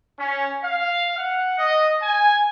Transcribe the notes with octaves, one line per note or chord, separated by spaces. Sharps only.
C#4
F5
F#5
D#5
G#5